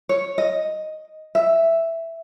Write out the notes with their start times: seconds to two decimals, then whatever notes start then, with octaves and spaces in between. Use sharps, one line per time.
0.09 C#5
0.38 D#5
1.35 E5